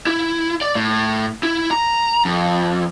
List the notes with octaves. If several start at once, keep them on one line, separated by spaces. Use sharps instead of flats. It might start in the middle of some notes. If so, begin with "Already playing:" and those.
E4
D5
A2
E4
A#5
F2